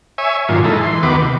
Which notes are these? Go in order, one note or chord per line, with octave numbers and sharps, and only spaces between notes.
C#5 E5 G#5
G2 A#2 D#3 F#3 F4
G#3 D#4 E4 A4
E3 C6
D#2 D#3 B3 F#4 B4 D6
C3